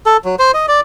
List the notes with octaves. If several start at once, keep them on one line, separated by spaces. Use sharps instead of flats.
A4
F#3
C5
D#5
D5